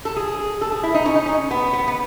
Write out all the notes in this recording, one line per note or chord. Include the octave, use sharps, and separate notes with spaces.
A4
G#4
A4
G#4
E4
D#4
C#4
D#4
C#4
B3
B3
B3